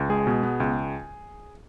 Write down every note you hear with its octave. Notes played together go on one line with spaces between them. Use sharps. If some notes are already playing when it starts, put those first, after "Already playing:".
Already playing: C#2
G#3 G#4
B2
B3
C#2